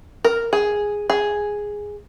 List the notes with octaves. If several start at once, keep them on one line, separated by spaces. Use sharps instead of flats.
A#4
G#4
G#4